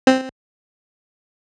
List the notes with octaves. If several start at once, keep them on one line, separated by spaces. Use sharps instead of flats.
C4